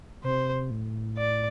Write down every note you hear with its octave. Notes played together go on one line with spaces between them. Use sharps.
C3 C5
A2
D5